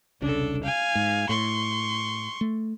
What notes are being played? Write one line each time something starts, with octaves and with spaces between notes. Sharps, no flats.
E1 C2 C#3 D4 A4
F5 G#5
G#2
A2 C6 C#6
A3